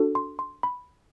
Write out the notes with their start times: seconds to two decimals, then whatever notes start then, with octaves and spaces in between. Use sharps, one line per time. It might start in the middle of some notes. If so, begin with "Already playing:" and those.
Already playing: D4 F#4 A4
0.15 C6
0.39 C6
0.63 B5